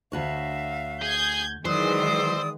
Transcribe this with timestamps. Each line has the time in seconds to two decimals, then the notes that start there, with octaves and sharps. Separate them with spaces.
0.12 D2 F#4 C#5 E5 F5
1.02 G#4 G6 G#6
1.65 D#3 E3 F#3 G#3 C5 D5 D#6 E6